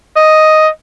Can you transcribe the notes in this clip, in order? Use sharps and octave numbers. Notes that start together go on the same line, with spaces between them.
D#5